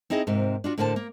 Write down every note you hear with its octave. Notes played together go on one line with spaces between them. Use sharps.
C4 D#4 E4 G#4 D#5
G#2 C3 C4 A#4
D4 F4 F#4
A2 D3 A#4 C5 F5 A5
A#3